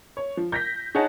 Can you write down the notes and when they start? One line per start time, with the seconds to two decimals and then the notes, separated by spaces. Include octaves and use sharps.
0.17 C#5
0.37 F3
0.52 G6 A#6 B6
0.95 D#4 G#4 C#5 F#5 A5